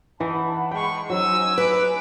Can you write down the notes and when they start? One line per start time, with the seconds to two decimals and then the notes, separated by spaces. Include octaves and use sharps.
0.20 E3 D#4 F#5 A5 B5
0.71 G#3 G5 C#6
1.10 F#3 C#4 D#4 C5 G#5 E6
1.58 D#4 B4 G#5 D6 F#6